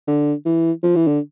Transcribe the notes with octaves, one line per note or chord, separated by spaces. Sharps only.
D3
E3
F3
E3
D3